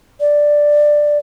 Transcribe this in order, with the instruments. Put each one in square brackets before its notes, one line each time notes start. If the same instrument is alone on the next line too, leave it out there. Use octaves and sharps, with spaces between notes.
[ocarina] D5